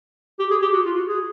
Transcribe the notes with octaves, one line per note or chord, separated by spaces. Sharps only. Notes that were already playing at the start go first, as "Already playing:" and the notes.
G4
G#4
G4
F#4
F4
F#4
G#4